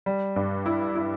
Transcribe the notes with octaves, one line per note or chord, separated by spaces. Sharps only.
G3
G2
E4
E4